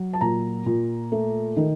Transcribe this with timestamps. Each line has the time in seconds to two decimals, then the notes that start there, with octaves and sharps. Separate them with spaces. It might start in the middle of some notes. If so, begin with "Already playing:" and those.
Already playing: F#3
0.13 A5
0.21 A#2 A#5
0.66 A#2
1.12 A3
1.57 D#3